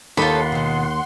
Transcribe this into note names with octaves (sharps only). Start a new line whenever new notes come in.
D#2 D#4 F4 A4 C#5 F#5 B5 C6
B2 D#3